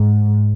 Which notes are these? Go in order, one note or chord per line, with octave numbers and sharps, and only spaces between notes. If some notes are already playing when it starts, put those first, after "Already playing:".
Already playing: G#2